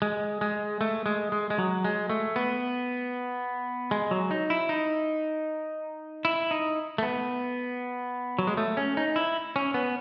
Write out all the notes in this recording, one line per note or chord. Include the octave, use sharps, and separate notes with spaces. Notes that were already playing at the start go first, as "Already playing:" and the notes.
G#3
G#3
A3
G#3
G#3
G#3
F#3
G#3
A3
B3
G#3
F#3
D#4
E4
D#4
E4
D#4
A3
B3
F#3
G#3
A3
C#4
D#4
E4
C#4
B3